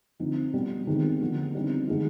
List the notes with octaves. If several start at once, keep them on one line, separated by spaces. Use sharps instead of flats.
D3 F3 C4 D#4
B2 G3 B3
D#3 G#3 C4 D#4
D3 F3 B3 D4
D3 G3 C4 D#4
D#3 G#3 B3 D#4